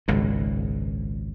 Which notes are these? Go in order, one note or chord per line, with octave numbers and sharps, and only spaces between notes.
G#1 C#2 A#2